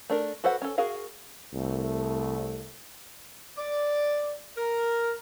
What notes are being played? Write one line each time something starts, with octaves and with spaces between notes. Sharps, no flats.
A3 D4 A#4
F#4 A4 B4 C5 F#5
C#4 A4
F#4 G#4 A#4 F5
C2 A3
D5
A#4